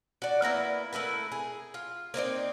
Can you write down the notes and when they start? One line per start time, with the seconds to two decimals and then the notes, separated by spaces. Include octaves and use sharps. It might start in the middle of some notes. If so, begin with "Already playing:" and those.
0.22 F#4 D5
0.42 A#3 B3 E4 A#5
0.93 A3 E4 A#4 B4
1.32 G#4
1.74 F4
2.14 A#3 C4 D#4 D5